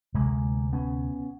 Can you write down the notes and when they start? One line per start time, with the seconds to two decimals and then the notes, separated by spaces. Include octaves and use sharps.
0.14 D2 C3 G#3 A#3
0.73 B3 C#4